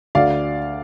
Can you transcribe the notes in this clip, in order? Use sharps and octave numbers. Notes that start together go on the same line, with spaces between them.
D2 D5 F5